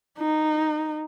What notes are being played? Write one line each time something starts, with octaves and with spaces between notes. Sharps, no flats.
D#4